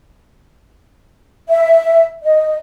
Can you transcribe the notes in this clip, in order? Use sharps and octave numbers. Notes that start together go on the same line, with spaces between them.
E5
D#5